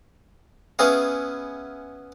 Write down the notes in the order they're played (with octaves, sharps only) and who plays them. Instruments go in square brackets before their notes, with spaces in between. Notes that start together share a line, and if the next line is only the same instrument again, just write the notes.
[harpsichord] B3 C#4 E4 G#4 F5